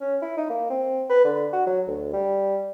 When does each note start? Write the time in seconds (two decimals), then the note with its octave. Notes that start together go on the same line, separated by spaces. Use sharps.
0.01 C#4
0.22 E4
0.37 D#4
0.50 A#3
0.70 C4
1.10 B4
1.25 D3
1.53 F#4
1.66 F#3
1.87 D2
2.13 G3